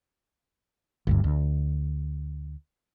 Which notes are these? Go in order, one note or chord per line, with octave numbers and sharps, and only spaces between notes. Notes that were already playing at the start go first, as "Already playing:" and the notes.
G1 D2 G2
D2